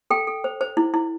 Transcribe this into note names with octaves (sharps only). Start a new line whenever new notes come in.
A4 G5
A4
C5
C5
E4
E4